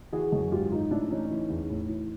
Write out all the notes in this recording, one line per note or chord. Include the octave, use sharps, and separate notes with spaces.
E3 F#4 G#4
F#2
G#2 F4 G4
D#3 D#4 F4
A2 D4 E4
E3 C#4 D#4
E3
E2
A2
E3